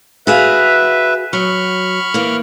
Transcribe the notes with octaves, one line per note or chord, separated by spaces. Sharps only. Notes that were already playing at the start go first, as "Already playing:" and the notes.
F#4 G#4 B4 E5 F5
F#3 B5 C#6 F6
E3 A#3